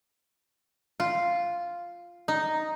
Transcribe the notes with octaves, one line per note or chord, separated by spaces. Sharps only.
F4
D#4